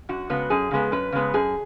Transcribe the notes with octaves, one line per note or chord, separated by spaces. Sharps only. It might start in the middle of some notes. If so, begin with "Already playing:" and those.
F#2 F#4
C#3 G#3 B3
F#2 G#4
C#3 G#3 B3
F#2 B4
C#3 G#3 B3
F#2 G#4